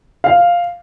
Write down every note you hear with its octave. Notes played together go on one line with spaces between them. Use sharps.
F5